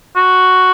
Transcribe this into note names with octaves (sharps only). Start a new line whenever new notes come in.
F#4